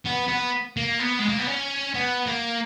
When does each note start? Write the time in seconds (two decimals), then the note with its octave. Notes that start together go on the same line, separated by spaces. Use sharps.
0.06 B3
0.28 B3
0.77 A#3
0.99 B3
1.19 G#3
1.29 A#3
1.38 B3
1.47 C#4
1.94 B3
2.27 A#3